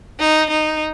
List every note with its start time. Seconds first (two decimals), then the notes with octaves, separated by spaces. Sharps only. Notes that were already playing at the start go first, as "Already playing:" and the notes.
0.20 D#4
0.50 D#4